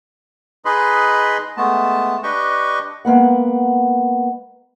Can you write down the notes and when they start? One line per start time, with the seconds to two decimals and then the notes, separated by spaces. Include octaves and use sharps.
0.65 D#4 G#4 B4 D#5 B5 C6
1.57 G#3 A3 B3 A5
2.23 D4 G4 B4 D#5 G5 C#6
3.05 G#3 A#3 B3 F#5